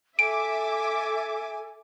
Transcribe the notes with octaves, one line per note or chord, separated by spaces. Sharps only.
A4 E5 G#5 D6 D7